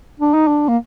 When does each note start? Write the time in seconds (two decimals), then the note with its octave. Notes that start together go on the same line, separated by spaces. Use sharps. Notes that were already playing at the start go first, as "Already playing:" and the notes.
0.20 D4
0.34 D#4
0.47 D4
0.68 A#3